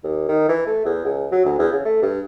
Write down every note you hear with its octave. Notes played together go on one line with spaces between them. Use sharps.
D#2
D#3
E3
A3
E2
C#2
F#3
D2
E2
C#3
A3
G2